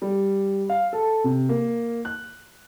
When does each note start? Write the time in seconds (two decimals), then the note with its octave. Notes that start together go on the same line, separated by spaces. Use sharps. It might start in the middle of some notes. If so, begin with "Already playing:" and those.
0.02 G3
0.70 F5
0.93 A4
1.24 C3
1.49 A#3
2.05 F#6